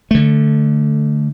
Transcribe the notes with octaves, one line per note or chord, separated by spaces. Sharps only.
D3 A3